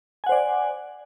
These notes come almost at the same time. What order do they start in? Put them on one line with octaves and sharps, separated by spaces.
G#5 F#5 C5 D5